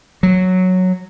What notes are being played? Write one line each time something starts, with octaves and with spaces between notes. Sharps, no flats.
F#3